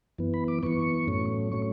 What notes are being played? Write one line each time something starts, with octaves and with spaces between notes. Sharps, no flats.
F#2 E3 B3
B5
D6
F#2 E3 B3 C#6
A2 F#3 A3 C#4
A2 F#3 A3 C#4 C#6